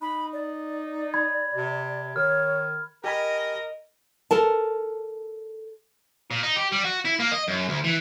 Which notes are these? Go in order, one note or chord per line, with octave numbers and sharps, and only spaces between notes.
D#4 B5
D5
B5 G#6
C3
D#3 C#5 F6
G4 A#4 D#5 G#5 B5
A4 A#4 A5
A#2
D#4
G4
G3
F#4
E4
A#3
D#5
F#2
D2
E3